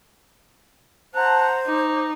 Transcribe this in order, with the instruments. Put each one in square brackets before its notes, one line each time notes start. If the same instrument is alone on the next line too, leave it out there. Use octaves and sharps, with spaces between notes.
[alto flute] C5 [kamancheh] F#5 A#5 [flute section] A5 F#6
[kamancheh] D#4 [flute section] D6